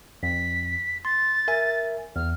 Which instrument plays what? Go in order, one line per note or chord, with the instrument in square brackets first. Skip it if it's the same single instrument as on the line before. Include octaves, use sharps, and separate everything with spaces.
[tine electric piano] F2 [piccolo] B6
[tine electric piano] C6 [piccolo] A6
[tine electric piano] A#4 E5 G#5
[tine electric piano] E2 [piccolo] F6